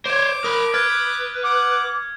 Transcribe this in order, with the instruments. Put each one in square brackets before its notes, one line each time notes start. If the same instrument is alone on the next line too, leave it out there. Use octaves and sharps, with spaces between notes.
[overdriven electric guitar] C5 C#5 [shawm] D6
[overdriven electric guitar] A#4 B5 [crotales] D#6
[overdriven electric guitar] B4 [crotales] F6 G#6 A6
[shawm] F#5 [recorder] D6